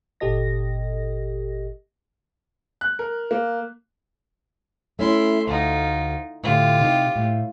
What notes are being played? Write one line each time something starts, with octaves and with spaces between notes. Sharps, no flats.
G1 A#2 G4 A4 D#5 A#6
F#6
A#4
A#3
A3 C#4 E4 E5 C6
D2 D#4 F4
A2 D3 F4 G4
C3 D#4
A2